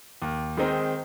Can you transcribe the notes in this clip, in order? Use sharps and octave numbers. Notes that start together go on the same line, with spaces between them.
D#2
D#3 G#3 C4 D#4